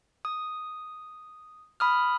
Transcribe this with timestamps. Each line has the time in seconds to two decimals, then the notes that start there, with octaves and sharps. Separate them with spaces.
0.25 D#6
1.80 B5 D#6 F6